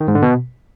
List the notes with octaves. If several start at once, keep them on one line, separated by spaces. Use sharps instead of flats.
D#3
G#2
D3
B2